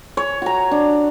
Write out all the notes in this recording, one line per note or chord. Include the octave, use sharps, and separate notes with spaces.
C#5
F#4 A#5
D4